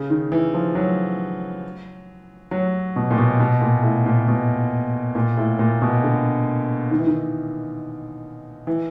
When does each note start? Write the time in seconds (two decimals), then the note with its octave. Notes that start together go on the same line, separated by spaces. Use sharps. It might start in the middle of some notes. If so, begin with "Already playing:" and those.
Already playing: C#3
0.10 D#3
0.32 E3
0.54 F3
0.75 F#3
2.51 F#3
2.96 B2
3.11 A#2
3.18 B2
3.40 B2
3.61 A#2
3.83 A2
4.06 A#2
4.28 B2
5.15 A#2
5.37 A2
5.59 A#2
5.82 B2
6.03 D3
6.91 D#3
6.99 E3
7.07 D#3
8.67 E3